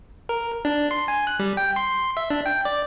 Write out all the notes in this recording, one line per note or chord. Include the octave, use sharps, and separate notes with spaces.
A#4
D4
C6
G#5
F#6
G3
G5
C6
E5
D4
G5
D5